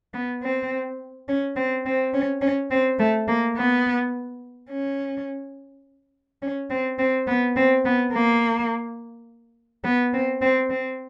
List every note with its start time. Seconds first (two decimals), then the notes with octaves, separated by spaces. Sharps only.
0.14 B3
0.43 C4
1.29 C#4
1.57 C4
1.86 C4
2.15 C#4
2.42 C#4
2.71 C4
2.99 A3
3.28 A#3
3.57 B3
4.70 C#4
6.42 C#4
6.71 C4
6.99 C4
7.28 B3
7.56 C4
7.86 B3
8.13 A#3
9.84 B3
10.14 C4
10.42 C4
10.70 C4